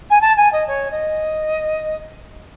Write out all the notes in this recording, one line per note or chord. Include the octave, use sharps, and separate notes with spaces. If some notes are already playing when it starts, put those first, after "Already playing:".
G#5
A5
G#5
D#5
C#5
D#5